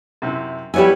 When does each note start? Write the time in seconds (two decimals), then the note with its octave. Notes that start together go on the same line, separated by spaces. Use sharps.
0.22 F#2 C3 E4
0.74 G3 B3 E4 G4 C#5 G#5